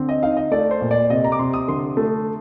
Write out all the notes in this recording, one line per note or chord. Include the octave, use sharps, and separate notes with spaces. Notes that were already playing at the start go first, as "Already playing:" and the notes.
Already playing: D3 C4
D#5
D#4 F5
D#5
A3 D5
C5
A#2
D5
C3 D#5
A#5
D6
C3 C6
D#6
D3 C6
A3